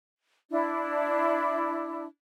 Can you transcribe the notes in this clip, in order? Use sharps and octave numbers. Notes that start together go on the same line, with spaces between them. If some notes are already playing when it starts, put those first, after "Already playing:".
D4 E4